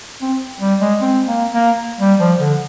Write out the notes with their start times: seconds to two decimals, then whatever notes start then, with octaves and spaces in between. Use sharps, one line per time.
0.21 C4
0.60 G3
0.81 G#3
1.01 C4
1.28 A#3
1.53 A#3
2.00 G3
2.19 F3
2.39 D3